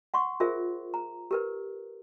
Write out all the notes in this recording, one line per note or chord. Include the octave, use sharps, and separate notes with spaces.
F#5 C6 C#6
F4 G#4 A#4 C5 E5
A#5
G4 A#4 B4